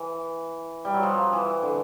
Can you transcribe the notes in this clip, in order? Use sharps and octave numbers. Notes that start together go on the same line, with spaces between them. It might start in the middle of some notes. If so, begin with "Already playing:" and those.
Already playing: E3
G3
F#3
F3
E3
D3